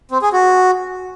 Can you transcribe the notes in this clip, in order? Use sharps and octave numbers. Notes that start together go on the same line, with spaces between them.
C4
G#4
F#4